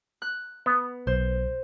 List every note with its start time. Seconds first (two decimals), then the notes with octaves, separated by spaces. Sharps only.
0.22 F#6
0.66 B3
1.07 B1 C5